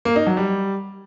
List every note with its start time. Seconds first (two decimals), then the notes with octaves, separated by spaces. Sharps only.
0.05 A#3
0.16 D#4
0.26 F#3
0.37 G3